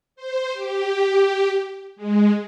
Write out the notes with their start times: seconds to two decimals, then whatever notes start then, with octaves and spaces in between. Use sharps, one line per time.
0.16 C5
0.53 G4
1.96 G#3